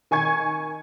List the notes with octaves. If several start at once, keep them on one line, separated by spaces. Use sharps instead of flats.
D#3 G#5 C#6 G#6